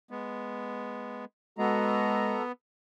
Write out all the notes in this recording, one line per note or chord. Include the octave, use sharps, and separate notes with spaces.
G#3 B3
G#3 B3 F#4 A4 A#5